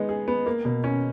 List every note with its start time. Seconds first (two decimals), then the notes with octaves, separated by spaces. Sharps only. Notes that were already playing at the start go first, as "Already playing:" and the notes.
Already playing: G#3 B3 D#4
0.09 G#4
0.28 B3
0.46 A#3
0.65 B2
0.84 C#4